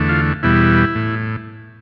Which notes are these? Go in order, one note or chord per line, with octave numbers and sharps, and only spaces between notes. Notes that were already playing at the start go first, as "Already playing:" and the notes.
Already playing: E2 D3 A3
F4
E2 B2 G3 E4
A2